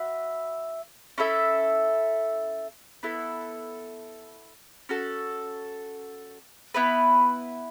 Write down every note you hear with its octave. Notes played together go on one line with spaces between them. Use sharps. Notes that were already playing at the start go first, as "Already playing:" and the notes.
Already playing: F#4 B4 E5
C#4 E4 A4 E5
B3 E4 A4
C#4 F#4 A4
B3 E4 B4